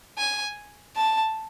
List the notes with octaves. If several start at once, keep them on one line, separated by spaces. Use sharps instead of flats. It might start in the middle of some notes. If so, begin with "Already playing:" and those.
G#5
A5